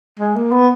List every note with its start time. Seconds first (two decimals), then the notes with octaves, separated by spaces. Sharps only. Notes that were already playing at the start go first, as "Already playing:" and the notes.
0.19 G#3
0.36 A#3
0.51 B3